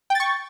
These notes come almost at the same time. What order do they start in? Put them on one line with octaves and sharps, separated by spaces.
G5 A6 C#6